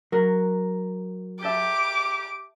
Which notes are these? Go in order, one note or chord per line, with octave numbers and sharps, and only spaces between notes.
F#3 A#4
G4 E5 A5 D6 G6